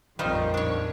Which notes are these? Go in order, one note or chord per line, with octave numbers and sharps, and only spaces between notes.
A#1 F2 D#3 G3 D#4 F4 C5
D4 C#5